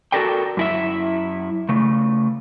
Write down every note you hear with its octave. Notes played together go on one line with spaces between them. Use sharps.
F#4 G4 A4 A#4 D5 G5
F#2 E4 E5
C#3 A3